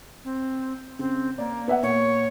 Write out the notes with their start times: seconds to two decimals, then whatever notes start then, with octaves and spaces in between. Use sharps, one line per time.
0.25 C4
0.99 C#3 C4
1.38 A#3 D5
1.68 B3 E5 F#5
1.83 A#2 C#5